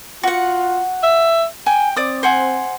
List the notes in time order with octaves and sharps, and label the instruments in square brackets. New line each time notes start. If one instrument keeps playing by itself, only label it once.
[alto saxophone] F4 [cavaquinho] F#4 F#5
[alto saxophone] E5
[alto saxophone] G5 [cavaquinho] G#5
[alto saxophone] C4 [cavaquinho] D5 D#6
[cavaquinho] C5 F#5 G#5